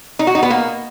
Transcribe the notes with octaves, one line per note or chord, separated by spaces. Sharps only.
D#4
F#4
D#4
B3
A#3